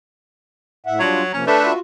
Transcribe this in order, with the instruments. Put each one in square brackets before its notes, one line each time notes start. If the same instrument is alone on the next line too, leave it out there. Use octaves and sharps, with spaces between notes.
[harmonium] A2 E5 F#5
[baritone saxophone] F#3 [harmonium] G3 D4 F4
[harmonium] C3 F3 A#3 [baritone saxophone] C#4
[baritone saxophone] A3 [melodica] D4 [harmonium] A4 [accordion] B4 E5
[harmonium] F4 F#4